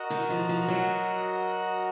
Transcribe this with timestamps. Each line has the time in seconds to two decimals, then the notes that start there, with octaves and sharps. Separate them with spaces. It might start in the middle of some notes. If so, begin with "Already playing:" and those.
Already playing: F#4 A#4 D#5 F#5
0.10 D#3
0.31 F3
0.49 F3
0.68 F#3